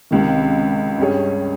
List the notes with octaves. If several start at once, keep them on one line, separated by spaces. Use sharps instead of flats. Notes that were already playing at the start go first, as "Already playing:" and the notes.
C#2 C3 D#3
G2 G3 C#4 G#4 C#5